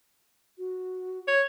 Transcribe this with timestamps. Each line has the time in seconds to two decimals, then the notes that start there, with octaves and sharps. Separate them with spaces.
0.58 F#4
1.28 C#5